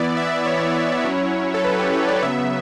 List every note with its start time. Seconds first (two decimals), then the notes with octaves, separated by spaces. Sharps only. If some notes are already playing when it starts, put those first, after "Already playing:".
Already playing: E3 B3 E4 D5
0.17 E5
0.46 C#5
1.04 F#3 C#4 E4
1.54 A4
1.64 B4
1.79 G4
1.93 C#5
2.07 D5
2.22 C#3 F#3 B3 E5